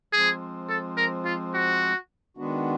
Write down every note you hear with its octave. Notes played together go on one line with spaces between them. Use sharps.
F3 G#3 C4 G#4
A4
A#4
F4
F#4
D#3 G#3 B3 D4 F#4